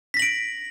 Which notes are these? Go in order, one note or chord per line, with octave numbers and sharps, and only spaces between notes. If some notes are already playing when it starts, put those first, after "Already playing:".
A#6 B6 D7 F#7